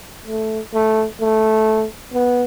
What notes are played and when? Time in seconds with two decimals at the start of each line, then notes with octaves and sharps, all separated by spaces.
0.27 A3
0.74 A3
1.21 A3
2.13 B3